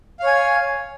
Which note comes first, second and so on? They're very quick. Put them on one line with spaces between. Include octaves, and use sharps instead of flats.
F5 C#5 G#5